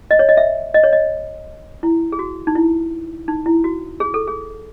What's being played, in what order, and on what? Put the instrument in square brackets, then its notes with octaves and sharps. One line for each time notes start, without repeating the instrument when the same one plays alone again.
[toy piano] D#5
C#5
D#5
E5
D#5
C#5
D#5
E4
G#4
F#4
D#4
E4
D#4
E4
F#4
G#4
A4
G#4